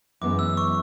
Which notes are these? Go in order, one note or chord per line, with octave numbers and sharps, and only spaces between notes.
F#2 E3 G#3 B3 D6
E6
C#6